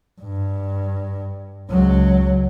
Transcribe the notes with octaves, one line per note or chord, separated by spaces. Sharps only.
G2
C#2 F#3